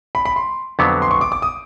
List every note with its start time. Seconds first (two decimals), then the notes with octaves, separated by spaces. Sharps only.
0.15 B5
0.25 B5
0.36 C6
0.79 F2 D3 F#3 B3
1.02 C6
1.11 C#6
1.21 D6
1.32 D6
1.42 D#6